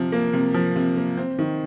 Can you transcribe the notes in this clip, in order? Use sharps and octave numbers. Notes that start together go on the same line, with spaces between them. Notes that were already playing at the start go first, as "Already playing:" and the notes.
Already playing: C3 F3
A#3
C3
F3
C3
A#3
C4
D#3